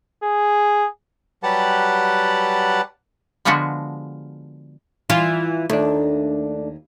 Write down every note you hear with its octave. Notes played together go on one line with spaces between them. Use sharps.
G#4
F#3 G3 G4 B4 F#5 A5
D3 F3 G#3 B3 D4 F#4
E3 F4
D#2 A3 D4